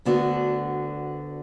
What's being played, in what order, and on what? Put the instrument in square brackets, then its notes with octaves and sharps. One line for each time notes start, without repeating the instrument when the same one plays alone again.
[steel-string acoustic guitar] D2 D3 B3 D4 F#4